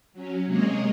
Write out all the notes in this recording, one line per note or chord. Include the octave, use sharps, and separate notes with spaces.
F#3 C#4
C3 G#3 A#3 G#4 C#5 D#5